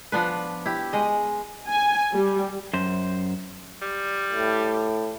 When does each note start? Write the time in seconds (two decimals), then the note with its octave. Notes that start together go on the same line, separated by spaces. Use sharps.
0.12 F3 B3 D4 B4
0.66 E4 G4
0.93 G#3 D#5
1.68 G#5
2.14 G3
2.73 F#2 C5
3.82 G3
4.32 A2